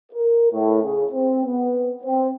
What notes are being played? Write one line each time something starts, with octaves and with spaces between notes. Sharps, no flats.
A#4
A2
C#3
C4
B3
C4